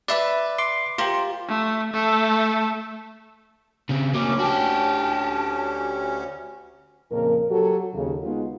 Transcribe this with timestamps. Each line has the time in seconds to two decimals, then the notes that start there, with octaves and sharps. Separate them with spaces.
0.08 B4 D5 E5 B5
0.59 C6 D6
0.98 F4 G4 A#4 C5
1.48 A3
1.93 A3 A4
3.89 C#3 C4
4.14 D2 F#3 A#3 C#4 D6
4.39 F#4 G4 A5
7.11 F2 A#2 C#3 A#4
7.50 F#3 F#4 G4 A4
7.94 D#2 C#3
8.24 G#3 B3 D#4 F4 F#4